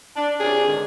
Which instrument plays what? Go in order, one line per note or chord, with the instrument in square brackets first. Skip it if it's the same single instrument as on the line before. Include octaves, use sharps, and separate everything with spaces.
[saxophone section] D4
[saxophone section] C3 C#4 D4 [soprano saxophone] G#4
[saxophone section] G#2 D3 D#3